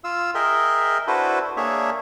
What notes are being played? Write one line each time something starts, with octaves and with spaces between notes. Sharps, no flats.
F4 F5 E6
G#4 A#4 D#5 E5 G5
D4 E4 F#4 A4 B4 C5
A#3 D4 G#4 C#5 E5